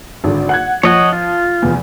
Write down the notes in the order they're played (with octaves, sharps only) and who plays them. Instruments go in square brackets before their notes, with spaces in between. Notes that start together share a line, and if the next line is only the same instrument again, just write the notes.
[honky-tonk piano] G#1 D3
F#5 F#6 G#6
[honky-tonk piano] F3 [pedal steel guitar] C#5 D#5 F#5
[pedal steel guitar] F4
[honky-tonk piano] F1 E2